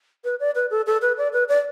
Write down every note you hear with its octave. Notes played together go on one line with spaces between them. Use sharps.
B4
D5
B4
A4
A4
B4
D5
B4
D5